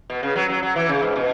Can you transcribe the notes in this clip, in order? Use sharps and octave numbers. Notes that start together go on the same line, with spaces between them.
B2
C#3
F#3
F#3
F#3
E3
C#3
G#2
B2